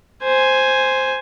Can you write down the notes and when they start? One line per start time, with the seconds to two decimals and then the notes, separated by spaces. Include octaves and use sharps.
0.23 C5 G#5